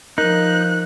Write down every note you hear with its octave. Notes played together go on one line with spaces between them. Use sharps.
F3 D#4 A#4 F#6